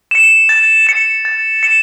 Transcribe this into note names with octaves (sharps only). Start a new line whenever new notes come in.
C#7 E7
A6
C#7 E7
A6
C#7 E7